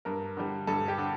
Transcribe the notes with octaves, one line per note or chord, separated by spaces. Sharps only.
G2 A#4
D3 G3
G2 A4
G4
D3